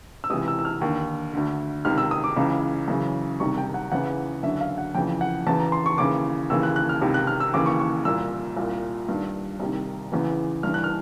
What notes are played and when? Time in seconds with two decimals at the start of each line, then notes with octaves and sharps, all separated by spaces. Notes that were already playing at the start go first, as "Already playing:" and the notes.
0.24 E6
0.30 C#2 C3 E3 D#6
0.48 E6
0.59 E6
0.65 F6
0.81 D#2 D3
1.33 D2 D3
1.85 C#2 C3 D#3 F6
1.98 E6
2.11 D#6
2.24 D6
2.36 C#2 C#3 E3
2.88 F#2 C#3 E3
3.40 C2 C3 D#3 C#6
3.58 G5
3.74 F#5
3.92 E2 C#3 E3 F#5
4.43 F#2 D3 E5
4.61 F5
4.78 F#5
4.94 F2 C#3 E3 G5
5.21 F#5
5.47 E2 C#3 E3 A5
5.60 A#5
5.72 C6
5.86 C#6
5.98 D#2 C#3 E3 D6
6.50 D#2 C#3 E3 E6
6.63 F#6
6.76 F#6
6.89 F6
7.01 C#2 C3 D#3
7.14 F#6
7.27 F6
7.40 E6
7.54 D#2 C#3 E3 D6
7.66 C#6
7.79 C#6
8.05 C2 A#2 E6
8.57 C2 A#2
9.09 G2 D#3
9.60 C2 C3 D#3
10.12 E2 C#3 E3
10.63 G2 E3 F6
10.74 F#6
10.84 F6